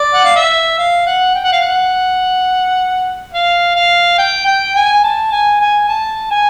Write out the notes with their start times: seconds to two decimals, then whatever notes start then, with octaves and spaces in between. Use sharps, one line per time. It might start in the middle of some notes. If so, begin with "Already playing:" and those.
Already playing: D5
0.14 F#5
0.24 F5
0.36 E5
0.78 F5
1.06 F#5
1.35 G5
1.44 F#5
1.52 F5
1.62 F#5
3.33 F5
3.75 F5
4.18 G5
4.46 G5
4.75 G#5
5.03 A5
5.32 G#5
5.60 G#5
5.88 A5
6.31 G#5